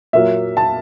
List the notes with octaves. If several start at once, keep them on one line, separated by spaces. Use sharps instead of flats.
A#2 F#3 A#3 E5
A5